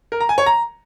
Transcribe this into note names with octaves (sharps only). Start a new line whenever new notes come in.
A#4
A#5
G#5
C#5
A#5